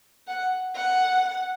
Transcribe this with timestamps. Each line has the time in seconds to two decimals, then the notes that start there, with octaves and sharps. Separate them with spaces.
0.28 F#5
0.76 F#5